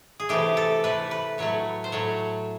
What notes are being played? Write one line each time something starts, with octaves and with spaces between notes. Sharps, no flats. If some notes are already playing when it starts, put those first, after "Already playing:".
G#4
C3 E3 A3 G4
A4
C3 E3 A3 B4
B4
A2 F#3 A3 C#5
C5
A2 F#3 A3 C#5